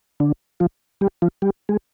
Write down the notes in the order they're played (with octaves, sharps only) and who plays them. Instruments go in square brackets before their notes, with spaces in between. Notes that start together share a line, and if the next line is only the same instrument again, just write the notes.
[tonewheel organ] D3 D4
F3 F4
G3 G4
F3 F4
G3 G4
G#3 G#4